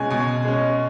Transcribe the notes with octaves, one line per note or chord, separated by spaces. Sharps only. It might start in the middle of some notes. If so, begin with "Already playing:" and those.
Already playing: B2 G#3 C#4 G#5
B2 G#5
G#3 C#4